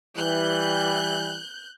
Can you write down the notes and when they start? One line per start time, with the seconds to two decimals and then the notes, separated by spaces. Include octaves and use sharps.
0.17 E3 G3 F#6 G6